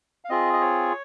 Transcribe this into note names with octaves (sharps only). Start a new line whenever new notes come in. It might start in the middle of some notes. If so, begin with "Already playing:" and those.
F5
C4 F4 G#4 D#5
D#5
C#5